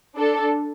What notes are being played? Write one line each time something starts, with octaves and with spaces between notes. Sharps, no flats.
D4 A4